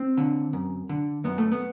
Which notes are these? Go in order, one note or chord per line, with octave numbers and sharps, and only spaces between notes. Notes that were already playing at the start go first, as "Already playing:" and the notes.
Already playing: C4
D3
F#2
D3
F#2 B3
A3
B3